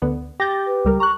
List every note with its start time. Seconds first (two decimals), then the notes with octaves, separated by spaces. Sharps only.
0.02 D2 D3 B3
0.40 G4 G6 A6 A#6
0.66 B4
0.85 C#2 G3 A#4
1.00 A#5 C#6 F#6